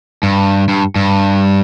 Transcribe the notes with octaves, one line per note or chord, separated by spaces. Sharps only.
G2
G2
G2